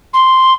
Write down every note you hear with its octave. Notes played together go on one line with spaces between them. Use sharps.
C6